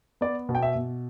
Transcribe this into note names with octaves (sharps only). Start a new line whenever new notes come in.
B3 D5
B2
G5
E5
B2